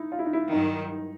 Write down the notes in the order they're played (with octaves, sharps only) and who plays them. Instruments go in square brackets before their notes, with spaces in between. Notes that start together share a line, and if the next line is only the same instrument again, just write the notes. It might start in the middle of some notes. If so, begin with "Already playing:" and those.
Already playing: [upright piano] D#4 E4
F4
E4
D#4
E4
[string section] G2 D#3 F#3 [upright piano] D#4